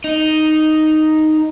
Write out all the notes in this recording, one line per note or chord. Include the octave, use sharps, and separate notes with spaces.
D#4